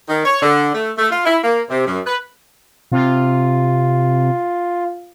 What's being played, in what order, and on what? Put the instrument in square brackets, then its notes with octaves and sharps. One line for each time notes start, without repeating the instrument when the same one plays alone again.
[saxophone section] D#3
C#5
D3
A3
A3
F4
E4
A#3
C3
F#2
B4
[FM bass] C3 [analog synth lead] F4